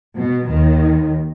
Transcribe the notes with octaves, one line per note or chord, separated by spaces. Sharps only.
B2
D#2 D#3